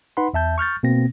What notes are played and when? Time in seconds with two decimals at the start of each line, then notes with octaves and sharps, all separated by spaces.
0.17 D#4 B4 F#5 B5 C6
0.34 E2 E5 A5 G6
0.58 C#6 F6 G6 A6
0.83 B2 A#3 C4 A#6